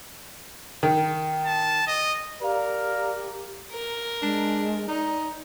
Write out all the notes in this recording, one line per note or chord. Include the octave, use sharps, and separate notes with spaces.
D#3
A5
D#5
G4 A#4 D5 F5
A#4
G#3 D4
D#4 D5